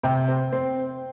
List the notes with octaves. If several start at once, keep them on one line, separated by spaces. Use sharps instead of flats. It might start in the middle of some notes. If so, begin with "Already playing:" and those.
C3 G5
C4
C4